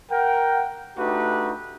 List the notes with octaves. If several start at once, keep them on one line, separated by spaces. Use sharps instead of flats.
A#4 F#5 G5
A3 D4 D#4 F#4 G4 B4